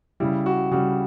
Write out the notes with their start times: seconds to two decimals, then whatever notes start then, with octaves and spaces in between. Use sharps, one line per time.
0.20 C#3 G3 E4
0.46 F#4
0.71 C#3 G3 F#4